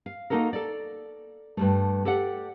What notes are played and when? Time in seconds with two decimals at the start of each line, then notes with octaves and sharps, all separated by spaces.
0.06 F5
0.30 A#3 C#4 D#4 F#4 A4 A#4
0.53 A4 D5
1.57 G2 G3 A3
2.05 G4 A4 D5 F#5